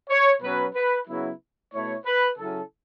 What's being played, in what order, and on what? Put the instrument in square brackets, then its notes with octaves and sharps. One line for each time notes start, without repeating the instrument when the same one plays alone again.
[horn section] C#5
B2 F#3 C#4 B4
B4
C#3 F#3 B3 E4
B2 A3 E4 C#5
B4
C#3 F#3 C#4 E4 A4